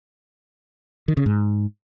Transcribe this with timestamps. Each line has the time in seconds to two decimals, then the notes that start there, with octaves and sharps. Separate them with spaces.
1.08 D#3
1.17 C#3
1.26 G#2